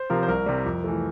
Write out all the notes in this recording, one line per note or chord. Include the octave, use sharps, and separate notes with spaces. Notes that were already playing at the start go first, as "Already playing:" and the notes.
Already playing: C5
C3 F3 A#4
C5
C2 A#4
C3 G3
F2
E3 A3